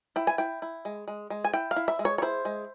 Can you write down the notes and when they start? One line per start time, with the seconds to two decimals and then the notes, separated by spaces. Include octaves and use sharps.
0.16 E4 G5
0.27 G#5
0.38 E4 G5
0.62 E4
0.85 G#3
1.08 G#3
1.30 G#3
1.44 G#5
1.53 E4 G5
1.71 F5
1.76 E4
1.88 E5
1.99 G#3
2.05 C#5
2.18 C#5
2.22 E4 C5
2.45 G#3